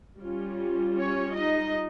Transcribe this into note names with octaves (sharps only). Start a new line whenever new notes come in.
G3 C#4 F4
C#4 C#5
D#4 D#5